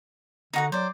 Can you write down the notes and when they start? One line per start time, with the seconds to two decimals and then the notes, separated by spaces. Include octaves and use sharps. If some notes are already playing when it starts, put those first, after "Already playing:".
0.53 D3 D#4 F#4 F#5
0.72 F#3 C5 D5